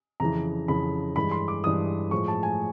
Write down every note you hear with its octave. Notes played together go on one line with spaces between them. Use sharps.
F2 C#3 E3 A#5
F2 C#3 E3 B5
G2 E3 G#3 B5
C6
D6
G2 E3 G#3 D#6
A2 F3 G#3 C#6
A5
G#5